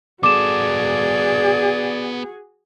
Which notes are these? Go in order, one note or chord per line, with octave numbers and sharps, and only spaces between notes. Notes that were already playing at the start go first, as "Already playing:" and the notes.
B3 F#4 G#4 A4 D5 D6 E7